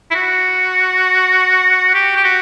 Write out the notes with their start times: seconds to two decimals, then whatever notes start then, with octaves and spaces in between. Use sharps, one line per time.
0.11 E4
0.15 F#4
1.94 G4
2.16 G4
2.24 F#4